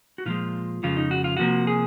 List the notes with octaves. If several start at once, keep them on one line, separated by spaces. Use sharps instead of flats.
F#4
A#2 F3 G#3 F4
F2 C#3 F3 G#3 F4
D#4
F#4
F4
C3 F3 A#3 F#4
G#4